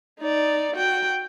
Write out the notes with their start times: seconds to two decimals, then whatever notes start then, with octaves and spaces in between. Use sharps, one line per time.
0.20 D#4 D5
0.75 F#4 G5